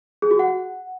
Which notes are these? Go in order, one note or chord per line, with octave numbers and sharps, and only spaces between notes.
G#4
F#4
F#5